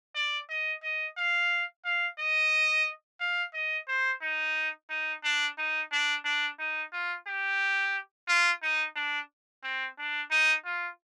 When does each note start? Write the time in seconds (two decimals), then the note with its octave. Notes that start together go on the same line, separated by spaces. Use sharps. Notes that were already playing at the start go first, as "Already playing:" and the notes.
0.15 D5
0.50 D#5
0.83 D#5
1.17 F5
1.85 F5
2.19 D#5
3.20 F5
3.54 D#5
3.88 C5
4.22 D#4
4.90 D#4
5.24 D4
5.58 D#4
5.92 D4
6.25 D4
6.59 D#4
6.93 F4
7.27 G4
8.28 F4
8.62 D#4
8.96 D4
9.64 C4
9.98 D4
10.31 D#4
10.65 F4